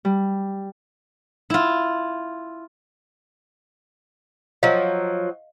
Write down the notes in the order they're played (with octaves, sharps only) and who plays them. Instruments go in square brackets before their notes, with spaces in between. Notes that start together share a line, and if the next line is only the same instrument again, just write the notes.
[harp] G3
[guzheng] E4 F4
[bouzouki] F3 F#3 [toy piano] D#5 F5